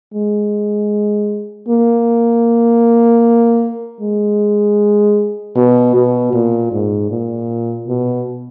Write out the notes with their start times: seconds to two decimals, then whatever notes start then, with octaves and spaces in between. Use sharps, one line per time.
0.14 G#3
1.69 A#3
4.01 G#3
5.56 B2
5.95 B2
6.33 A#2
6.72 G#2
7.11 A#2
7.88 B2